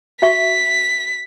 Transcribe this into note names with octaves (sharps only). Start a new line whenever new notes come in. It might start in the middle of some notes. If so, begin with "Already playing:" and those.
F#4 E5 C#6 B6